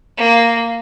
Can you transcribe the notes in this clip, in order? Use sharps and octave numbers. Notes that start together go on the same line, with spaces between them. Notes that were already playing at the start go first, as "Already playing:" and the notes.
A#3